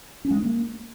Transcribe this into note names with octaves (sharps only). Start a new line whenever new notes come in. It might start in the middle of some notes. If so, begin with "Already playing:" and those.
C#4
G#3
D4
A#3